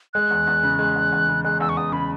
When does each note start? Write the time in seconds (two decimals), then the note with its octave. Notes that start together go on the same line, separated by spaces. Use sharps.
0.14 G#3 F#6
0.31 E2
0.47 E2
0.63 C#3
0.79 G#3
0.96 E2
1.12 E2
1.28 C#3
1.44 G#3 F#6
1.60 E2 E6
1.69 C#6
1.77 E2 D#6
1.92 C#3 B5